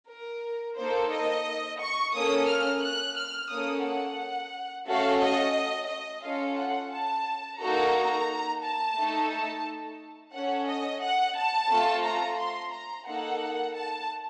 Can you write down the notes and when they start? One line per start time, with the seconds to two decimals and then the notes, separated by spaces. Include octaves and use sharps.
0.08 A#4
0.77 A#3 D#4 A4 C5
1.11 D#5
1.80 C#6
2.13 A#3 C#4 A4 D#6
2.48 F6
2.82 F#6
3.17 F6
3.50 A#3 C#4 A4 D#6
3.84 F#5
4.87 A3 C#4 F#4 A4 F5
5.21 D#5
5.89 D#5
6.24 C#4 F4 A4 F5
6.58 F#5
6.92 A5
7.60 A#3 D#4 F#4 A4 A#5
8.62 A5
8.96 A3 D#4 A4
9.31 A5
10.33 C#4 A4 F#5
10.67 D#5
11.02 F#5
11.36 A5
11.70 A3 C4 F4 A4
12.05 A#5
12.38 C6
12.72 A#5
13.07 A#3 D#4 A4 F#5
13.74 A5